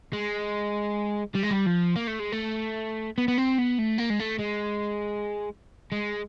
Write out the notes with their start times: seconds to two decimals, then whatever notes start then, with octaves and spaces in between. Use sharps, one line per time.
0.13 G#3
1.35 G3
1.43 G#3
1.50 G3
1.66 F3
1.96 A#3
2.07 A3
2.20 G#3
2.32 A3
3.18 B3
3.28 B3
3.38 C4
3.58 B3
3.78 A3
3.98 A#3
4.10 G#3
4.20 A3
4.39 G#3
5.92 G#3